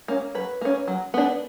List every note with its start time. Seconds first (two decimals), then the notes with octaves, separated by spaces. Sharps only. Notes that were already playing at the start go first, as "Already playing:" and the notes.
0.08 A#3 C#4
0.35 F#3 B4
0.61 A#3 C#4
0.88 F#3
1.14 B3 D4